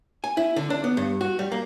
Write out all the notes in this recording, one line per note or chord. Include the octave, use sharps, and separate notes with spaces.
G#5
E4
D3
D4
B3
G2
F#4
G3
A#3